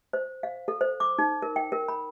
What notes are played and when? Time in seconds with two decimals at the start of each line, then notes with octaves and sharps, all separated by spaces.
0.13 C5
0.43 F5
0.68 A4
0.81 C5
1.00 D6
1.19 D#4
1.42 A#4
1.56 G5
1.72 A#4
1.88 B5